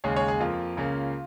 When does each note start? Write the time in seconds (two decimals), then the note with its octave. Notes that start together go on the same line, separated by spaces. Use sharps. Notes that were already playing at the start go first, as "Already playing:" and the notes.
0.04 D#2 C#3 G#3 G#4 C#5
0.16 G#4 C#5
0.28 G#4
0.40 F2 F3 A#3 F4
0.76 C#2 C#3 A#3 C#4